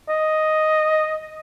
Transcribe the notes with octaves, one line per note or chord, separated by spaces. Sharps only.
D#5